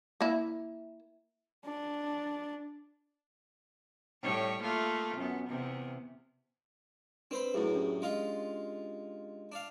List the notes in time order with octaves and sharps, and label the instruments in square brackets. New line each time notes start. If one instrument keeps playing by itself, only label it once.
[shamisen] A#3 E4
[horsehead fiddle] D4
[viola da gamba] A2 G3 C#5
A3 A#3 F4
F#2 B3
E2 C3
[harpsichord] C4 C5 B5 [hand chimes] D4 B4
[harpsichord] F#2 A2 [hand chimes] E4 G#4
[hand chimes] C#4 D4 G4
[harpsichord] G#3 F4
D4 F5